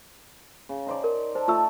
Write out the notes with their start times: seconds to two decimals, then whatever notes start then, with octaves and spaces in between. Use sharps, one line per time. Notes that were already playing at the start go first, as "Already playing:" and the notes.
0.69 C#3
0.87 D#4 C5 D5
1.04 A#4
1.35 A4 C5
1.48 A3 F4 E6